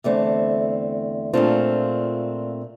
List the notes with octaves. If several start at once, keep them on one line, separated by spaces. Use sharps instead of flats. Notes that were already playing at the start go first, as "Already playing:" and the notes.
E2 D3 A3 C4
A#2 A3 C4 D4 F4